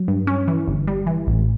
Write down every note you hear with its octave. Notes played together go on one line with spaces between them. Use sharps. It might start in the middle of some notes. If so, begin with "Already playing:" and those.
Already playing: F#3
G2
C#4
E3
G1
G3
E3
A1